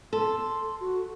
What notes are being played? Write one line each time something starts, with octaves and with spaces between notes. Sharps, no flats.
A4 C6
F#4